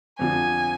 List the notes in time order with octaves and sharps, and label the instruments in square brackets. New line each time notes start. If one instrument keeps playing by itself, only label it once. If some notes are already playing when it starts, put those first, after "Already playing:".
[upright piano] F2 D3 F3 [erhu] G#5